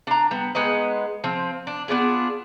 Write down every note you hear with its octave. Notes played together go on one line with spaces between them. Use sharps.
D4 A#5
G3 B3
G#3 B3 D#4 D#5
F3 C4
D4
B3 D4 F4 G#4